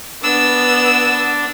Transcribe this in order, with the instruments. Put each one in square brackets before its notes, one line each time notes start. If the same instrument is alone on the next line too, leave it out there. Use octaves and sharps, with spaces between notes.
[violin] B3 E6 [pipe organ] D4